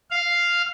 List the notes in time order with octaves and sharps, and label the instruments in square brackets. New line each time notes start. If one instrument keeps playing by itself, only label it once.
[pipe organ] F5